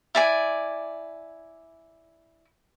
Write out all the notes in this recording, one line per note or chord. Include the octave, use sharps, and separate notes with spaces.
E4 D5 G#5